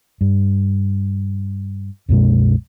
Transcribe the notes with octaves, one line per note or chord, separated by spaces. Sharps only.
G2
C2 F#2 B2 G#3